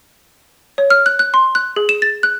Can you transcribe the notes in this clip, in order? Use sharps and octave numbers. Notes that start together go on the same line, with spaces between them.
C#5
F6
F#6
F#6
C6
F#6
G#4
E7
A6
F#6